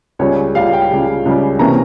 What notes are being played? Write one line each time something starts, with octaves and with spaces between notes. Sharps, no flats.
C#2 C#3 G3 C#5
C#2 C#3 G3 F5
G5
C#2 C#3 G3
C#2 C#3 G3
C3 E3 A#3 C#4 A#5